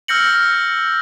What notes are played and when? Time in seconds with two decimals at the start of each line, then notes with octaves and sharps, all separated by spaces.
0.08 E6 F6 G6 A#6 C#7 F#7